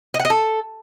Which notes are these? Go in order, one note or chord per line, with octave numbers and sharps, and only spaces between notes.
D#5
F#5
D#5
A4